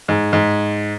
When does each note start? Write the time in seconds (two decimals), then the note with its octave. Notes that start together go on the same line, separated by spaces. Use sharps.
0.08 G#2
0.33 G#2